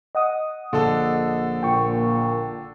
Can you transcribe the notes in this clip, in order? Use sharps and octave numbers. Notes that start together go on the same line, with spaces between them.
D#5 F#5 D#6
A#1 D3 A4
A#2 G5 C#6